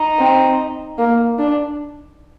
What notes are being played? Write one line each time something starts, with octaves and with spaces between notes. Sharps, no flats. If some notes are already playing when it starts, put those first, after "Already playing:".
Already playing: D#4
C4
A#3
D4